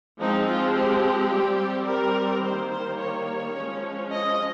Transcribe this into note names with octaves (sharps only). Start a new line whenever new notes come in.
F3 G#3 C4 D#4
F4
G4
G3 C4
A#4
D#3 G3 A#3 C5
C5
C#5
F3 G#3 C#4
D#5